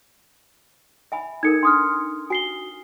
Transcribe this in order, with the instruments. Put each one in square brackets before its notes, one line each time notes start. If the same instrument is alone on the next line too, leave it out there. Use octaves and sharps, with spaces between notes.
[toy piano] E5 G#5 B5
[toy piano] D#4 A4 A#4 [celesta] G#6 C#7
[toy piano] D4 [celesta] C6 D#6 F6
[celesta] F#4 C7 G7 [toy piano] G#5